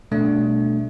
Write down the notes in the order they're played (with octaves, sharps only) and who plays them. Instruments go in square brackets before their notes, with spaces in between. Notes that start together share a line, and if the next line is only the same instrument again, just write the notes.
[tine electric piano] B2 G3 A3 D4